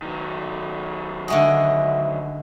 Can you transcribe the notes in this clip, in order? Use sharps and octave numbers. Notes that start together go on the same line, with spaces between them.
D#3 F#3
D3 G#3 F#4 E5 G#5 D#6